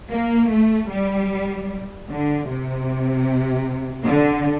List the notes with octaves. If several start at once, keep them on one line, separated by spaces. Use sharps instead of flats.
A#3
A3
G3
D3
C3
D3